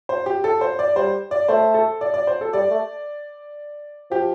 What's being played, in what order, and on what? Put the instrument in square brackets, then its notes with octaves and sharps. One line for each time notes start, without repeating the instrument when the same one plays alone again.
[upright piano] C5
G4
A4
C5
D5
[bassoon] G3 [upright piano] C5
[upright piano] D5
[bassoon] A3 [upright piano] C5
[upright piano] A4
D5
D5
C5
A4
[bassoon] G3 [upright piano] D5
[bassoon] A3
[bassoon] F3 [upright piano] G4